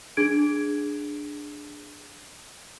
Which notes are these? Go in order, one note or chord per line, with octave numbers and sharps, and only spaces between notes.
D4 G#4 G#6 D7